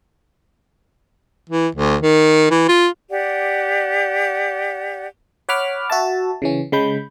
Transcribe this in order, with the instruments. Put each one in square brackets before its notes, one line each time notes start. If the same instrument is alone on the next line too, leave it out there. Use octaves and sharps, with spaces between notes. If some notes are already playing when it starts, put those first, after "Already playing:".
[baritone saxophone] E3
D2
D#3
E3
F4
[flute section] G4 D5 F#5
[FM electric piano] C#5 F#5 B5 D6 F6
F#4 E5 A5
C#3 E3 C#4
C#3 G#3 B5 G6